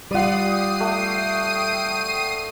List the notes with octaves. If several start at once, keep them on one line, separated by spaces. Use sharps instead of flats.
G3 F4 D5 F#5 D#6 C7 D#7
G4
A3 G5